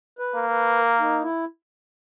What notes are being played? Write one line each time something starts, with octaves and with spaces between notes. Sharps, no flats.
B4
A#3
B4
A#4
D#4
E4